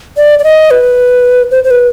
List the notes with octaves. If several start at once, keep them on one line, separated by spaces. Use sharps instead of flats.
D5
D5
D#5
B4
C5
C5
B4